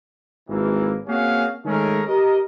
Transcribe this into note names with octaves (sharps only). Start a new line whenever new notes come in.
G#1 E3 A#3
A#3 C4 C#4 F#4 G#4 F5
D#3 G#3 A3 C#4 G#4 A#4
G4 A#4 D#5